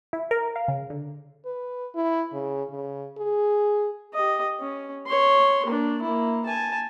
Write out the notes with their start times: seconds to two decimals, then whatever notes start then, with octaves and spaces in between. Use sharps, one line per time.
0.13 E4
0.31 A#4
0.56 F5
0.68 C#3
0.90 D3
1.45 B4
1.95 E4
2.34 C#3
2.70 C#3
3.18 G#4
4.14 G4 D#5
4.60 C#4
5.07 C#5 C6
5.65 A#3 D4
6.02 A#3 E4
6.45 G#5 A5